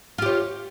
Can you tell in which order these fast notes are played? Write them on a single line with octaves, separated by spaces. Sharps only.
F4 G4 C#5